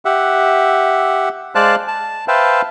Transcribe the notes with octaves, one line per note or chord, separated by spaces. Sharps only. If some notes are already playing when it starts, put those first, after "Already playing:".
G4 E5 F#5
G#3 C5 D5 F5 A5 F#6
A5
B4 C5 E5 F5 G5 A5